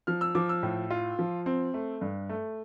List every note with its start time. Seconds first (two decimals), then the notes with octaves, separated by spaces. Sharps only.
0.07 F3 F6
0.21 E6
0.35 F3 D6
0.49 E6
0.63 A2
0.90 F4
1.19 F3
1.46 C4
1.74 A3
2.01 G2
2.29 A3